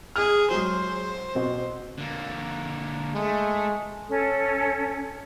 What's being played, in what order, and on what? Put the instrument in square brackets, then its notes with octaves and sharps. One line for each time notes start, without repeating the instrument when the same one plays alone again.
[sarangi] G#4 [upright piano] F6
[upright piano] F#3 G#3 [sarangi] C5
[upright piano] B2 C4
[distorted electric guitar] D3 A#3
[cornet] G#3 [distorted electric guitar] A3
[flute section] C#4 A4